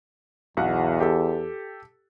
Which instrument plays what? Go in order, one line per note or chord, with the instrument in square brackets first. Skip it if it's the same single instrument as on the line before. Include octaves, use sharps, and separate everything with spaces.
[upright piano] B1 F#4 F#5 [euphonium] E2
[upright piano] G4 A4